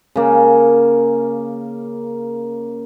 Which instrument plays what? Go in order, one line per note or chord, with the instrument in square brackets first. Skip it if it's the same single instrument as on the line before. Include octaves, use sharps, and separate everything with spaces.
[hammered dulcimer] C#3 A#3